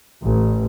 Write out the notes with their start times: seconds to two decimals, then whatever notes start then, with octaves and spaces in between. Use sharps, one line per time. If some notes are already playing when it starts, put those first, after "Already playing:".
0.24 A1